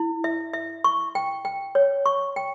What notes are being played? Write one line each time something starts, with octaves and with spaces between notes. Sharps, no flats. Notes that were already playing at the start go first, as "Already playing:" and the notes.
Already playing: E4
E5
E5
C#6
G5
G5
C#5
C#6
G5